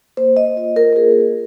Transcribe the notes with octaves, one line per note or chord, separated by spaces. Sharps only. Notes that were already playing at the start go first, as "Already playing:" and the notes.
A#3 C5
A#3 D#5
F4 D#5
F4 A#4
A#4
A#3 G#4
A#3